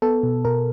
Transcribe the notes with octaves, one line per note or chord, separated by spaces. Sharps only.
B3 A4
B2
B2 A#4